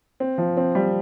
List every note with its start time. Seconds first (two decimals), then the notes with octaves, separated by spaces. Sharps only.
0.20 C4
0.38 F3
0.57 C4
0.75 G3